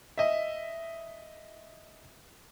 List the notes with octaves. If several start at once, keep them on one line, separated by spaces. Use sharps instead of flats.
D#5 E5